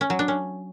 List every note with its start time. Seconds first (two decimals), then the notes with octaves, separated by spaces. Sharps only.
0.01 C#4
0.10 F#3
0.19 D4
0.28 C#4